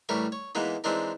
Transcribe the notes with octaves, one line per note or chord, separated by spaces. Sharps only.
A2 E3 G3 A#4 C#6
C#5
E3 G#3 A#3 B3 D#4
E3 G#3 C4 D4 D#4 A#4